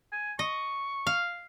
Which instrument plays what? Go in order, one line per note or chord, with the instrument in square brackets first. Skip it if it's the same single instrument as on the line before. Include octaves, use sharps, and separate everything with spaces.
[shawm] G#5
[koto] D#5 [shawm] C#6
[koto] F5